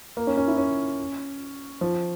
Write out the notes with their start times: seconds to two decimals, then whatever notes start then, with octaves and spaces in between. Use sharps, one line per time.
0.17 A#3
0.27 C#4
0.37 C#4
0.48 E4
0.58 C#4
1.81 F3